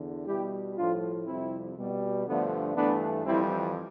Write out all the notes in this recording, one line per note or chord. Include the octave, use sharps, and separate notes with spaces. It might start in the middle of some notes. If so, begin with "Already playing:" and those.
Already playing: E2 D3
B2 G3 E4 G4
A2 F3 A3 D4 F4
F2 C3 G3 C4 E4
B2 G3
G2 D3 F3 A3 B3 D4
G2 E3 A3 B3 D4
F2 E3 G3 C4 E4